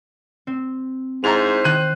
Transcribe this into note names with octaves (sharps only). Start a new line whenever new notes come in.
C4
G#2 E4 C5 A#5 A6 F7
D#3 F#6 D#7